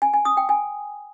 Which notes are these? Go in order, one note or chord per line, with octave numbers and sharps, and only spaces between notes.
G#5
G#5
D#6
G5
G#5